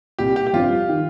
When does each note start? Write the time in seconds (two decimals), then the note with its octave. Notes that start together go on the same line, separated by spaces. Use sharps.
0.19 C2 A#2 G3 G4
0.36 G4
0.47 G4
0.53 G1 F2 C3 G3 D4 F4
0.89 D#3